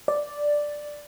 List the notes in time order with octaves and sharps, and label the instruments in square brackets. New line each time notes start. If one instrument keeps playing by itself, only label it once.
[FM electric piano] D5